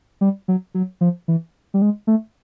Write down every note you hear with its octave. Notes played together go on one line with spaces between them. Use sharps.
G3
F#3
F#3
F3
E3
G3
G#3
A3